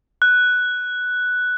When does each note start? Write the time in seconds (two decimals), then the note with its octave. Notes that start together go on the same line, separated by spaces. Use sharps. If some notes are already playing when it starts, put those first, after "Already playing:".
0.22 F#6